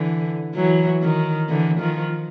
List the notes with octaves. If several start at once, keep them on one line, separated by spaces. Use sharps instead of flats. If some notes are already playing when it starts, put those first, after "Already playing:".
Already playing: D3 E3
E3 F#3
D#3
D3 E3
D#3 F3